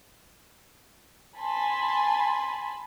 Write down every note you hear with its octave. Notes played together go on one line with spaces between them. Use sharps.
G#5 A5 B5 C6